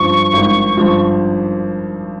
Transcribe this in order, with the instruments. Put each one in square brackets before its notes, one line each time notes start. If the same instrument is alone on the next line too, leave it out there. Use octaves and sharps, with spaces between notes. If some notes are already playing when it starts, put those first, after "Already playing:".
Already playing: [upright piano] G2 F3 [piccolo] C#6
[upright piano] G#1
G2 F3